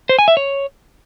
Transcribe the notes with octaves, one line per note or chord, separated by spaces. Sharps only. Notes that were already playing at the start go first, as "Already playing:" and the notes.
C5
G#5
E5
C#5